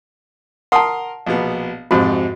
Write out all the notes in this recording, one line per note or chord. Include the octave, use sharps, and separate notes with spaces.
A#4 F#5 A5 C6 D#6
A#1 B2 B3
F2 G#2 C3 F#4